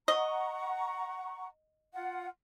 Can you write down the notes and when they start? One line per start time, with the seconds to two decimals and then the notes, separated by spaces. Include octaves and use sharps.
0.08 D#5 F#5 A#5 C#6
1.93 F4 F#5